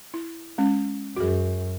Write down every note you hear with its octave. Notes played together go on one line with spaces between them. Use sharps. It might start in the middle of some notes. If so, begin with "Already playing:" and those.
E4
G#3 C#4
F#2 F#4 G#4